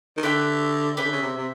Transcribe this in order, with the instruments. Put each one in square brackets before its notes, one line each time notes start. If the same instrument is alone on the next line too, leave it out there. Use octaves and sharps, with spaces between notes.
[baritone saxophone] D#3
[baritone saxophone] D3 [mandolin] G4 B4 E5 G5
[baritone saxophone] C#3 [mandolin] G4 B4 E5 G5
[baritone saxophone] D3
C#3
C3
C3